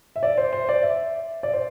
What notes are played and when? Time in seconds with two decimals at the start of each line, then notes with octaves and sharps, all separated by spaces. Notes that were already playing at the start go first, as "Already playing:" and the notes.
0.16 E5
0.23 D5
0.38 C5
0.53 C5
0.69 D5
0.83 E5
1.43 D5
1.53 C5